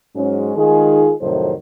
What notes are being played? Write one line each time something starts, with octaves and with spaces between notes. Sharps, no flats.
G#2 F#3 G#3 C#4
D#3 G#3 D#4 F4 G#4
F2 A2 C3 D#3 F#3 C5